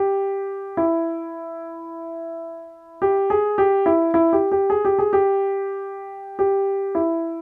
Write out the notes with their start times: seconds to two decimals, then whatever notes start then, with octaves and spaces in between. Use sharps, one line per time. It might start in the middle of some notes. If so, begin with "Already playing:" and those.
Already playing: G4
0.77 E4
3.02 G4
3.30 G#4
3.58 G4
3.86 E4
4.14 E4
4.33 G4
4.52 G4
4.70 G#4
4.85 G4
4.99 G#4
5.13 G4
6.39 G4
6.95 E4